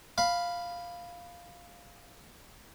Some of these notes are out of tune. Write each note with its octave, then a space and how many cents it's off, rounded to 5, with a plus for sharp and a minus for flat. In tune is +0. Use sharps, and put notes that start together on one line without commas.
F5 +0 B5 +0